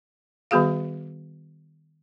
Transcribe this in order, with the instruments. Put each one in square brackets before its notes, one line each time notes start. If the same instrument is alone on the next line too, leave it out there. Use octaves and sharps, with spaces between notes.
[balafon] D#3 G3 B3 F#4 G#4 F5